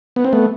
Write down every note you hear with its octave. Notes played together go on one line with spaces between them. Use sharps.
B3
C4
A3 B3